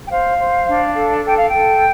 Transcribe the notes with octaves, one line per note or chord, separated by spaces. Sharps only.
G5
C5 F5
C5
D4
A4
A4 G5
F5
A4 G5